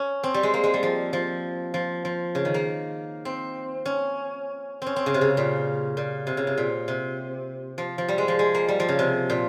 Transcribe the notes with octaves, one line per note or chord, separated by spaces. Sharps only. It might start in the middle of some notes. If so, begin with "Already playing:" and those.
Already playing: C#4
C4
G3
G#3
A#3
G#3
G3
F3
F3
F3
F3
C#3
D#3
A#3
C4
C#4
C4 C#4
C4
C#3
C3
C#3
A#2
A#2
C3
C#3
C3
A#2
C3
F3
F3
G3
G#3
F3
G#3
A#3
G3
F3
C#3
C3
A#2